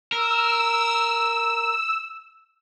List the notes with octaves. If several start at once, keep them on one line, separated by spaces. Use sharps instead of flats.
A#4 E6